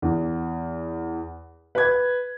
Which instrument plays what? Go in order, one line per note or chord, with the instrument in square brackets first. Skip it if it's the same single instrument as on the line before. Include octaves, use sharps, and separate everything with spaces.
[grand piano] E2
B4 G#6